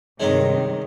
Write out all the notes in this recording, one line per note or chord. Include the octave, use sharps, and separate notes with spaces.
G2 C3 D#3 G#3 C#4 D#4